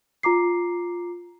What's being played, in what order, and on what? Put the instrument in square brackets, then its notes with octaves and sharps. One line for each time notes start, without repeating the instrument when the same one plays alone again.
[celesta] F4 A#5 D6 C7